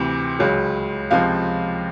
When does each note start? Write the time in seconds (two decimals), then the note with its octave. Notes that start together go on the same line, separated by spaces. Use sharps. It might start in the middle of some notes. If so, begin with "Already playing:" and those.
Already playing: D2 C3 E3
0.39 C#2 C#3 F#3
1.11 C#2 C3 F3 F5